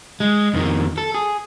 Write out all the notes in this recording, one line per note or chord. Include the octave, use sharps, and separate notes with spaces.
G#3
F2 D#3
A4
G#4